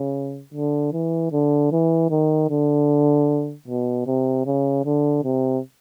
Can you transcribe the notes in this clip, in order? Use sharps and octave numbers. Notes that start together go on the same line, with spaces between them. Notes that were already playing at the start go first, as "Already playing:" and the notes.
Already playing: C#3
D3
E3
D3
E3
D#3
D3
B2
C3
C#3
D3
C3